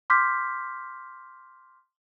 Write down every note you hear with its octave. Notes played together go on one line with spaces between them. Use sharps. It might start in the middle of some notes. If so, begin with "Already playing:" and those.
C6 D6 F6 G6 B6